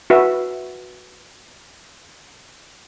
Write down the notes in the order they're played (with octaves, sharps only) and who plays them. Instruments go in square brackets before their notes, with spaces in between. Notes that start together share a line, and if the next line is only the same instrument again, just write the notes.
[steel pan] F#4 B4 E5